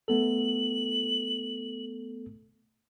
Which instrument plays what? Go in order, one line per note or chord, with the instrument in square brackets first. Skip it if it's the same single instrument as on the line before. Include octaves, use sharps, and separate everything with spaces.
[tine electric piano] A3 B3 A4 [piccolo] F#7